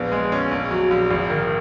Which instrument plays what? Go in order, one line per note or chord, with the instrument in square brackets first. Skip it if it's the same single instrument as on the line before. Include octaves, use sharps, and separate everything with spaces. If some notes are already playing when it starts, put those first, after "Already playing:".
Already playing: [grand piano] A#1 B3
G#3
C#4
A#1
F#3
A#1
G#1
D#3